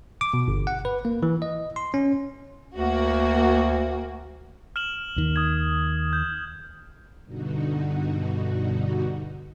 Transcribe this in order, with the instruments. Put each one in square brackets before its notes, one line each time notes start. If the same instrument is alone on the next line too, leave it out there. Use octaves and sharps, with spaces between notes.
[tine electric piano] D6
B2
G1
F#5
B4
A#3
E3
D#5
C6
C#4
[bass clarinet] D2 [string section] A#3 F#4
[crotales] F6 E7 F#7
[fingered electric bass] D#2 D#3
[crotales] D#6 G#6
G6
[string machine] G2 B2 D3 D#4 F#4